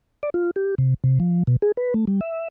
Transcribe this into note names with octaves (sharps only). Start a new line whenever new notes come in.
D5
F4
G4
C3
C3
F3
B2
G#4
B4
A3
G3
E5